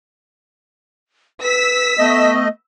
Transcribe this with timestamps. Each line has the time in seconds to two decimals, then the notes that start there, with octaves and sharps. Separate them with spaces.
1.42 B4 E6 B6
1.99 A3 B3 D#5